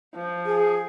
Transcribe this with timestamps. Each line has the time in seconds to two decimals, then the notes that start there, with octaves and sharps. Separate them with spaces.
0.15 F3
0.46 G#4